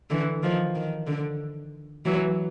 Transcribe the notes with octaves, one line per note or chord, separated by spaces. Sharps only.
D3 E3
D#3 F3
D#3
D3
E3 F#3